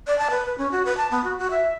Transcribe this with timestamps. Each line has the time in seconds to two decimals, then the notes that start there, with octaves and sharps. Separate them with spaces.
0.07 D5
0.18 A5
0.30 B4
0.46 B4
0.58 C#4
0.71 F#4
0.85 B4
0.97 A5
1.11 B3
1.24 F#4
1.38 F#4
1.50 E5